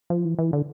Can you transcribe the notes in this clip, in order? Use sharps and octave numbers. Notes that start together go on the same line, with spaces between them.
F3
E3
E3
D3